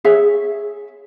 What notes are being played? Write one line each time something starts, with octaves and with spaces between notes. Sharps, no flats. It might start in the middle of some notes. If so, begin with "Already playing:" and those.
G#4 C#5 E5